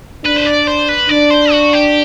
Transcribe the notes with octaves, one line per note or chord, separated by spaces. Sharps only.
D4 B4
C5
D5
C5
B4
D4 D5
C5
F#4
G4